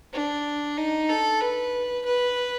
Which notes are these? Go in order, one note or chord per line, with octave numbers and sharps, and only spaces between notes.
D4
D#4
A4
B4
B4